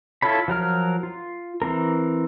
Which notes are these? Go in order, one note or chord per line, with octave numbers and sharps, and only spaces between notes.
E4 F4 A4 C#5 B5
F3 F#3 A#4 F6
F4
E3 C4 A#4